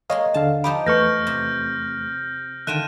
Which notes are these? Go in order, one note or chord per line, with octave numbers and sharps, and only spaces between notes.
G#3 A#3 C#5 D#5 F5 C6
D#2 D3 F5 A5
F3 D#4 G4 B5 D7
E2 A3 B4 C#6 F6 G6 A#6
C3
D3 D#3 A3 F4 G5 F#6 D#7 E7